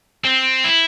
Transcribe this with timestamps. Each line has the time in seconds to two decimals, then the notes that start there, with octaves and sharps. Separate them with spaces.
0.24 C4
0.64 E4